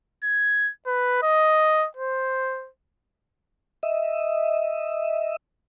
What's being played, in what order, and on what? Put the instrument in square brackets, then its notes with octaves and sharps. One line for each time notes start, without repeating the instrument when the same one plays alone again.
[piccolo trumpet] G#6
B4
D#5
C5
[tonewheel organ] D#5 E5